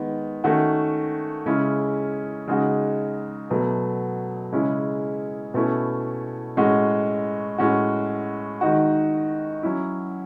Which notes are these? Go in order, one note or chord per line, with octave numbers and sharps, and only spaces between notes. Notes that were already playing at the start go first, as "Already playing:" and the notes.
Already playing: D#3 G#3 B3
D#3 A3 C#4 F#4
C#3 G#3 C#4 E4
C#3 G#3 D#4 F#4
B2 F#3 A3
C#3 G#3 C#4 E4
B2 A3 C#4 E4
A2 G#3 C#4 F#4
A2 G#3 C#4 F#4
D#3 G#3 D#4 F#4
F#3 C#4 E4